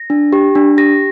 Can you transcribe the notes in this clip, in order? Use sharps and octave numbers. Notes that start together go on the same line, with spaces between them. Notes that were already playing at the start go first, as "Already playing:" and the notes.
Already playing: A#6
D4
G4
D4
G4 A#6